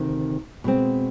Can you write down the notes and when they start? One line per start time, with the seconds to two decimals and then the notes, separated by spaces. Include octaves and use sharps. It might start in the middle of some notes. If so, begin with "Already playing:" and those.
Already playing: D2 C3 D#3
0.64 B2 G#3 C4